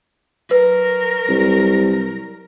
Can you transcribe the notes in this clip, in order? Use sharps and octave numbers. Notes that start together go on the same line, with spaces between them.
F#3 A#4 B4
C2